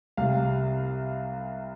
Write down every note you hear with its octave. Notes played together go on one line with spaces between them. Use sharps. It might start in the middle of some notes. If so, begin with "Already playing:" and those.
C2 C3 G3 F5